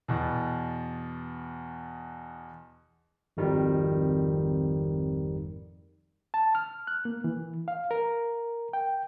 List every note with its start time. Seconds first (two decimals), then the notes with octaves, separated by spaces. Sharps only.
0.08 E2 B2
3.37 G#1 F2 D#3 G3
6.34 A5
6.55 F6
6.87 F#6
7.05 A#3
7.24 E3
7.68 F5
7.91 A#4
8.73 G5